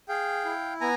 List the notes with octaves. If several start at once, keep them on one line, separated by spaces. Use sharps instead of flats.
G#4 F5 G5
E4
B3 G#5 A#5